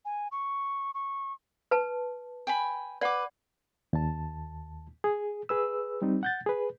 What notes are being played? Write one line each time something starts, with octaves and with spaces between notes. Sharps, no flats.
G#5
C#6
C#6
B4 A5
G5 G#5 B5
B4 D5 F#5 D6
D#2 A5
G#4
G#4 B4 E6
G3 C4 D#4
F#5 G6 A6
G#4 B4